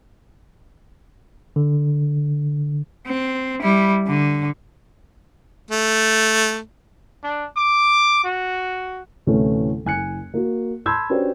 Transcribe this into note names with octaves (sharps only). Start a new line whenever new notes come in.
D3
C4
G3 E4
D3
A3
D4
D6
F#4
D2 A2 C3 E3 A3 C#4
F#1 G#5 F#6 C#7
A#3 F#4
A5 B5 C6 E6 G6 G#6
C#4 D4 F#4 G4 B4 C5